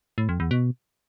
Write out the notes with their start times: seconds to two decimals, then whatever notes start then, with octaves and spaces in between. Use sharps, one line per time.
0.18 A2
0.29 F2
0.40 E2
0.51 B2